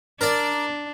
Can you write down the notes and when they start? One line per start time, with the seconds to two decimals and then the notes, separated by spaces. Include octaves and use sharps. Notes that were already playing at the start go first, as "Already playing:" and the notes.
0.21 D4 A#4 D5